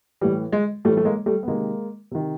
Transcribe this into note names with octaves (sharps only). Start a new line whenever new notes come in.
A2 E3 G3
G#3
A2 E3 G3 A3
A3
G#3 A#3
G3 A3
B3
C3 D#3 G#3 A#3
C3 D#3